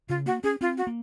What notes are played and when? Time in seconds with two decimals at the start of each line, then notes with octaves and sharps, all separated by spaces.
0.09 C#3 F4
0.26 A#3 F#4
0.44 C#4 G#4
0.61 C4 F4
0.77 F#4
0.87 A#3